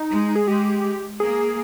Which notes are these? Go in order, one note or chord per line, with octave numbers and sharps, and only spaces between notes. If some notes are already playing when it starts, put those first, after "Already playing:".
Already playing: D#4
G#3
G#4
G#3 G4
A#3 G#4